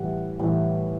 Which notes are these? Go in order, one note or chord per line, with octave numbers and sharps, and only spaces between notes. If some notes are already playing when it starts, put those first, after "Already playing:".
Already playing: A2 E3 G3 F#5
A2 E3 G3